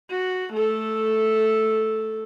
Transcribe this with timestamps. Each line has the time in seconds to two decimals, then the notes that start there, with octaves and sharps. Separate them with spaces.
0.11 F#4
0.53 A3 A4